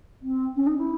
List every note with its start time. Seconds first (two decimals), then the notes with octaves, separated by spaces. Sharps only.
0.22 C4
0.56 C#4
0.66 D#4
0.78 E4